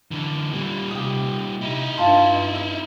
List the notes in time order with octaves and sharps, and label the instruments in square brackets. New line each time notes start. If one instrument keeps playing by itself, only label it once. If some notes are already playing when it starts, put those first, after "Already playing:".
[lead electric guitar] D3 E3
A#2 G3
[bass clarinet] C3 [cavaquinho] G4 D#6
[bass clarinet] C3 [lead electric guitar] D#4 E4
[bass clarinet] G2 [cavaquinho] F4 A5 C6
[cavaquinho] E5